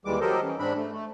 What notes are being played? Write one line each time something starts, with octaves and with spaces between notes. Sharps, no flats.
D#2 E3 G3 G#3 D6
F#3 G4 A4 A#4 C5 D#5
E3 C#4
G#2 C4 D4 B5
A3
A3